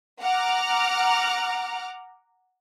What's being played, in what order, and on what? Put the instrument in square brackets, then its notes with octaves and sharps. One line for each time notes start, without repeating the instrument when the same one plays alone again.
[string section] F#5 A#5 D6 F6